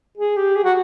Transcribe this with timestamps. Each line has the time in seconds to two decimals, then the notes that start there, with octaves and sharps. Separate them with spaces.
0.18 G#4
0.37 G4
0.56 G#4
0.64 F#4